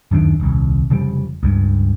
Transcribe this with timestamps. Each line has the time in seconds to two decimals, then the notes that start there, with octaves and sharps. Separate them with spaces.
0.11 D1 F#2 D#3 D4
0.40 D#1 C2
0.90 F1 C#3 F3 G3
1.43 C#2 G2